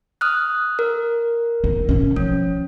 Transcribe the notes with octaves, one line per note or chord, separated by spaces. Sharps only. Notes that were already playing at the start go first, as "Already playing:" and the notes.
D#6 F6 F#6
A#4
B3 D#4
B2 C#4
F3 C#4